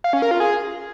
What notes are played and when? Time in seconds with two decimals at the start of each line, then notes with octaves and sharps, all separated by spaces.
0.04 F5
0.13 C#4
0.22 A#4
0.31 F4
0.40 G#4